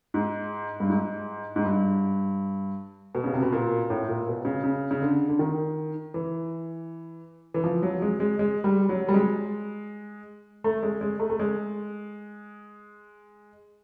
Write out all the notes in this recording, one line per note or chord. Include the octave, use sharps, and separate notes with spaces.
G#2
G2
G#2
G#2
G2
B2
C#3
C3
B2
A#2
A2
A#2
B2
C#3
C#3
C#3
D3
D3
D#3
E3
E3
F3
F#3
G#3
G#3
G#3
G3
F#3
G3
G#3
A3
G#3
G#3
A3
A3
G#3